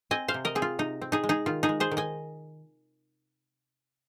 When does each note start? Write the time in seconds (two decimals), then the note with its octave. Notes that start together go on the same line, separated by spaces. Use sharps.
0.11 C4 D#5 G#5
0.28 C5 F5
0.34 C3
0.45 A#4 D#5
0.55 C4 G#4
0.62 F4
0.79 C3 D#4
1.02 C4
1.12 D#4 G#4
1.24 G#3
1.29 D#4 G#4
1.46 D#3 F4
1.63 D#4 G#4
1.69 G#3
1.80 G#4 C5
1.91 D#3
1.97 D#5 G#5